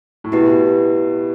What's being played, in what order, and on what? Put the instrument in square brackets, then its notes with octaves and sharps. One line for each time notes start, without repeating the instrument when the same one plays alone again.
[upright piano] A2
[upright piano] B2 [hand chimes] E4 G4 B4